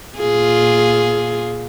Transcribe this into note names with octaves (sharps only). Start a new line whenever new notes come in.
A#2 F4 G#4